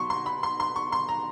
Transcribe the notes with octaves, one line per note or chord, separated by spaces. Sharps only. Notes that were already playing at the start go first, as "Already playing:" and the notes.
Already playing: B2 F#3 C6 C#6
C6
B5
C6
C6
C#6
C6
A#5